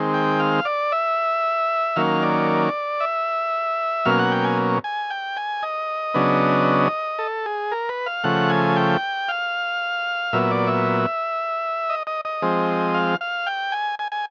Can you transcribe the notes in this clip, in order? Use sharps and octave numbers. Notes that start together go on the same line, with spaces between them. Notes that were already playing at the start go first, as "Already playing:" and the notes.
Already playing: D#3 G#3 C4
G5
F5
D5
E5
D#3 F#3 A#3 C#4 F5
D5
E5
B2 F#3 A#3 C#4 F5
F#5
G5
G#5
G#5
G5
G#5
D#5
C#3 F#3 B3 D4
A4
G#4
A#4
B4
F5
C#3 F3 A3 F#5
G#5
G5
F5
A#2 F#3 B3 E5
D5
E5
D#5
D#5
D#5
F3 G#3 C4
F5
F5
G5
G#5
G#5
G#5